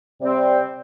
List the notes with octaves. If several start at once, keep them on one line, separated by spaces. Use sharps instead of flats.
C3 G3 C4